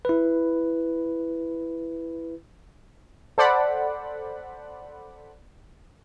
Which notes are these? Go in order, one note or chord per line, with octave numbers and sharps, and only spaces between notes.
E4 B4
A4 C5 D5 F#5 B5